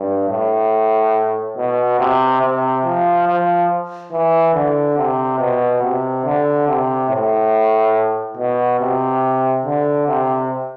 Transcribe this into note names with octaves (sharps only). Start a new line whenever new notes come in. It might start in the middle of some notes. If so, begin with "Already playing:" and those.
Already playing: G2
A2
B2
C3
C3
F3
F3
E3
D3
C3
B2
C3
D3
C3
A2
B2
C3
D3
C3